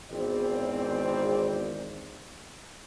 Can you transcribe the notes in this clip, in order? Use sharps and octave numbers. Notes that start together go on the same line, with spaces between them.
G#1 E2 C4 D5